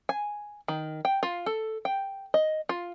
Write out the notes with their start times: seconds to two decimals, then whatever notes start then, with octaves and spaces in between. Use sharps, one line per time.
0.09 G#5
0.68 D#3
1.05 G5
1.23 F4
1.46 A4
1.85 G5
2.34 D#5
2.69 F4